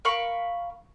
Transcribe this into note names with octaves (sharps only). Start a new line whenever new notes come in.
A#4 F5 B5 C#6